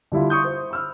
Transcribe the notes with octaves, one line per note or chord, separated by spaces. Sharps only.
D3 G3 E4 F4
C6 C#6 D#6 G6
C5
B5 E6 F6